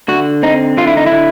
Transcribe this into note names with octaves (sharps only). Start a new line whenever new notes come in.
D3 F#4
C4 D#4
D3 F4
E4
D#4
E4
D3